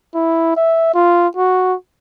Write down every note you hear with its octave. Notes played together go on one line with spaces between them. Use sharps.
E4
E5
F4
F#4